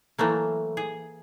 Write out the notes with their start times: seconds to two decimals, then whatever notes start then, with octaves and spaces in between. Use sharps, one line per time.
0.18 E3 F#3 A3 A#3
0.77 G#4